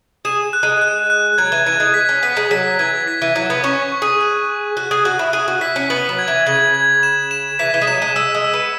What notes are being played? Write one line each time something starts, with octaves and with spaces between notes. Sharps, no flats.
G#4 E7
F#6
G#3
F#6
F#6
F#3 G#6
E3
E3 G#6
G#3
B6
C#4
B3 B6
G#3
F#3 B6
E3 G#6
B6
E3
F#3 G#6
B3
C#4 C#6
C#6
G#4
F#6
C#6
F#4 F#6
G#4
F#4 F#6
E4
G#4 F#6
F#4
E4 B6
C#4
B3 F#7
F#3
G#6
E3
C#3 G#6
G#6
E7
E7
E3 B6
E3
G#3
F#3 E7
G#3
G#3 E6
G#3
E6
B3